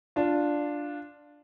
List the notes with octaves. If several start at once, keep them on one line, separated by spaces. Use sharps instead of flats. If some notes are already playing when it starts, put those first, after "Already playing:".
D4 F4